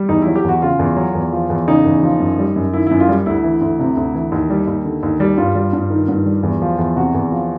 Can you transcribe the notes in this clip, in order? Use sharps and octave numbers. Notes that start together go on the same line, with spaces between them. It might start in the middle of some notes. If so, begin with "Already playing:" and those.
Already playing: G3
E2 D#4
F#3 E4
G4
E2 F#4
C#3 F4
E2
F#3
E2
F3
E2
C#3 D#4
E2
F3
F#2
G3
F#2
D#3 E4
F#2 E4
F4
G3
D2 E4
E3
D2
C3
D2
E3
D#2
G3
D#2
D3
D#2
G3
G2 F4
G3
G2
D#3
G2
G3
E2
F3
E2
C3 F#4
E2
F3